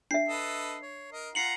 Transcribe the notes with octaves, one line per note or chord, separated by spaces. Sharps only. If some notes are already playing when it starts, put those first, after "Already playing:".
D4 E5 C7
A4 B4 D#5
C#5
A#4 D#5
F4 F#5 A#5 C7 C#7 F#7